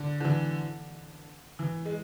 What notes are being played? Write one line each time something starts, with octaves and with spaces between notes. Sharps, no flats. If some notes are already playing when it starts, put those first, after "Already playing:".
Already playing: D3
D3
E3
E3
G#3